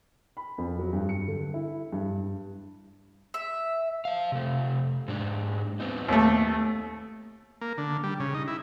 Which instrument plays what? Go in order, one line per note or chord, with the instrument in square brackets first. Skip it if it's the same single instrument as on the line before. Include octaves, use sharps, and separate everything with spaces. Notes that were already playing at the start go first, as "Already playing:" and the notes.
[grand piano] B5
F2
F#3
G2
C#7
D3
E4
G2
[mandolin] E5
[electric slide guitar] C5 F5
C3 A3
G#2 D4
B3 C4 D#4
[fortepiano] D#2 A3
[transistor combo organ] A#3
D3
G3
C#3
D#4
E4